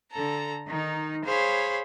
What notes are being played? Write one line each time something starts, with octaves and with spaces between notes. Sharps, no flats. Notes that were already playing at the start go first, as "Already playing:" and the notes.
D3 A4 A#5
D#3 D#4
G#4 C5 C#5 F5 B5